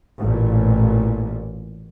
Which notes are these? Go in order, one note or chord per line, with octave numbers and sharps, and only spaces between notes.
A1 A#2